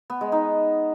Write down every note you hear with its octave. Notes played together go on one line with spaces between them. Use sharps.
B3
G#3
D#4